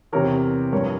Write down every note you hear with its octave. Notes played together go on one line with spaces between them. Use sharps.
E2 C3 E3 A#4 C#5
G2 F3 A#4 C#5